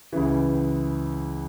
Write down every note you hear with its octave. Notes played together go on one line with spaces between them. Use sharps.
C#2 C#3 E3